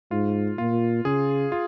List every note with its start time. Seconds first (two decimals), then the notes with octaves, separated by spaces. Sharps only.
0.11 G#2 F4
0.58 A#2 F4
1.05 C#3 G#4
1.52 F4